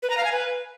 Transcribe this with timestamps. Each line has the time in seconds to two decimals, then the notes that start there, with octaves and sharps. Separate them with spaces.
0.03 B4
0.10 A#5
0.17 F5
0.25 G#5
0.32 B4